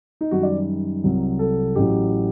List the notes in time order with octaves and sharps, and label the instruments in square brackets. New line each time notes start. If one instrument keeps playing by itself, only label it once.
[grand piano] D#4
F#2 D#3 G3 F#4
D5
C2 C3 F#3
A4
A1 A2 F#3 G4